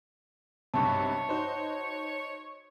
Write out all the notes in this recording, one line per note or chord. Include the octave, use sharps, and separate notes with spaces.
B1 G2 C3 C#5 A5 C#6
D#4 F#4 C5